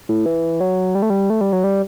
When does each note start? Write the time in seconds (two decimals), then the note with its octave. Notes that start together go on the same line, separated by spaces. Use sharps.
0.09 A2
0.26 E3
0.61 F#3
0.95 G3
1.02 A3
1.10 G3
1.30 A3
1.41 G3
1.53 F#3
1.64 G3